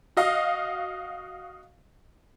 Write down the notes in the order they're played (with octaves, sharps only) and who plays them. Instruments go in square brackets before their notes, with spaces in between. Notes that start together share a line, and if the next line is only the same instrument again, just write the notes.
[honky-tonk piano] F#4 D#5 F5